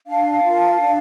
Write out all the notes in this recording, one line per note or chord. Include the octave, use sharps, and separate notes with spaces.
D4 F5 A5
F4 A#4
D4